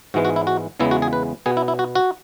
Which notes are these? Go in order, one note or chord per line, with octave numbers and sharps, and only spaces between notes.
G#2 E3 G#3 B3 F#4
F#4
E4
F#4
E2 C#3 E3 G#3 B3 E4
F#4
G#4
B4
B2 B3 G#4
E4
E4
F#4
F#4